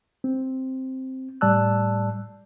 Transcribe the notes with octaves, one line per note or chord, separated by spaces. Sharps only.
C4
A2 G3 D5 A5 E6 F#6